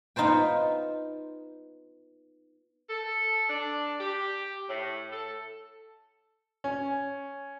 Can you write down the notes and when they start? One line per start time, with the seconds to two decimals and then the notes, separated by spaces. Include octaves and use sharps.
0.16 B3 D#4 F4 C5 G5
2.90 A4
3.50 D4
4.00 G4
4.69 A2
5.13 A4
6.64 C#4